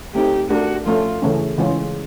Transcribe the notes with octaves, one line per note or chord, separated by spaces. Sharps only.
A3 C4 D#4 G4
A3 D4 F#4 G4 A#4
F3 A3 C#4 F4
C#3 E3 A3 C#4
C#3 E3 G#3 C#4 F4